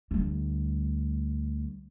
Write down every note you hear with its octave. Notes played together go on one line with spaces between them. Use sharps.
D2 G3